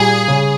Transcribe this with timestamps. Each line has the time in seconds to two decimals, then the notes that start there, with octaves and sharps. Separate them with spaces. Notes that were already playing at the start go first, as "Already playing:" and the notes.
Already playing: A#2 G3 G#4
0.28 C#3